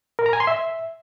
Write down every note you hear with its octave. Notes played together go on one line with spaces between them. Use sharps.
A#4
A#5
G#5
C6
E5